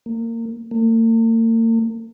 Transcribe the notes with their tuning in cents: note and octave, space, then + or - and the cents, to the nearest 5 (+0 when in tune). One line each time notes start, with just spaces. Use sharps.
A#3 -25
A#3 -45